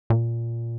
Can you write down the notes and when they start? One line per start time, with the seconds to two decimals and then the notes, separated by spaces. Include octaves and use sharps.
0.10 A#2